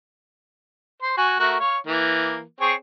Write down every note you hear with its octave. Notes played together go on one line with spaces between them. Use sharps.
C5 C6
F#4 G#5
A3 F#4 A#4
C#5 F5
E3 A#3
C4 G#4 C#5